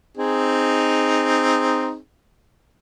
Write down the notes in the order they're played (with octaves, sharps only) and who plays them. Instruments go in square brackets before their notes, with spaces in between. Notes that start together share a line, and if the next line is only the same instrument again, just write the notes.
[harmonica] C4 D#4 G#4